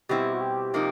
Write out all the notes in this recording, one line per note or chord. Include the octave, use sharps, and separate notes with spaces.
B2 G3 C4 E4 G4
F#4
G4
C3 F3 A#3 D#4